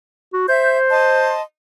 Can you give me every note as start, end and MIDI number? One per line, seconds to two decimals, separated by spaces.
0.34 0.48 66
0.49 1.35 72
0.49 0.78 76
0.49 0.78 91
0.91 1.41 75
0.91 1.41 81
0.91 1.41 84